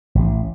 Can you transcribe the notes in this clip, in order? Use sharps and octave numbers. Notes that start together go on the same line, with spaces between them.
A1